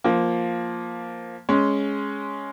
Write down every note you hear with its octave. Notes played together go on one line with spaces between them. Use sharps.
F3 A#3
G#3 C#4